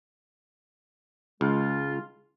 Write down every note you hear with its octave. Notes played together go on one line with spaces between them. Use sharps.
C#2 G#3 F4